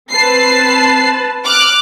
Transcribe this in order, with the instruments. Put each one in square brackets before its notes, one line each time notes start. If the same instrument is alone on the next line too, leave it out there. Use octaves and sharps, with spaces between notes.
[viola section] C4 B4 A5 [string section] C7
[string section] D6 F6 F#6